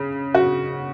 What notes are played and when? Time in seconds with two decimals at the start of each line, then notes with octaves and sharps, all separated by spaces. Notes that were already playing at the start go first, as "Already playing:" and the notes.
Already playing: C#3
0.35 F#4